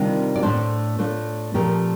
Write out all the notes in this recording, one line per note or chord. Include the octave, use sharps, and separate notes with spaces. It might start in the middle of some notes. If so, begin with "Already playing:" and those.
Already playing: C3 D#3 G3 D4 F4
D5
A2 A3 D4 A4 C5
A2 A3 D4 F4
A#2 F3 A3 C4 G4 A#4